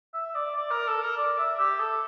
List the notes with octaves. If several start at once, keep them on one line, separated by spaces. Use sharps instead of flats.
E5
D5
D5
A#4
A4
A#4
D5
E5
G4
A4